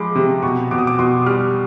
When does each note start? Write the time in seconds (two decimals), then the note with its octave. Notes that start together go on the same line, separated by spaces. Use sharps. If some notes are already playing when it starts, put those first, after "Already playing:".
Already playing: F3 G#3 B5 C6 D6
0.15 C3
0.43 B2 C#6
0.71 B2 D6
0.78 D#6
0.87 D6
0.99 B2 C6
1.26 G3 F6